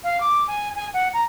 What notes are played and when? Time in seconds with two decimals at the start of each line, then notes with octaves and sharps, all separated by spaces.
0.04 F5
0.20 D6
0.47 G#5
0.76 G#5
0.93 F#5
1.13 A#5